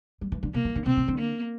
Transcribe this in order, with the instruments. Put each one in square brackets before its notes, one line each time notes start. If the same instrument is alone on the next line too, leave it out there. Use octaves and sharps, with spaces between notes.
[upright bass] G3
E3
D3
[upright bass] C3 [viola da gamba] A#3
[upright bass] E3
D3
[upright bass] C3 [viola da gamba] C4
[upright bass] C3
D3
[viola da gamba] A#3